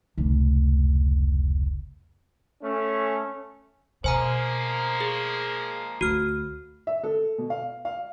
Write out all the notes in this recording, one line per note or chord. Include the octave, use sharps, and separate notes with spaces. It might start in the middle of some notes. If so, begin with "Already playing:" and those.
F1 C#2
A3 C#4
B2 F3 G#3 A#3 C5 G#5 A#5
G#4
D2 F#4 F6
E5
A4
B2
F5
F5